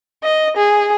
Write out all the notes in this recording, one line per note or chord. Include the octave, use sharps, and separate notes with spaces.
D#5
G#4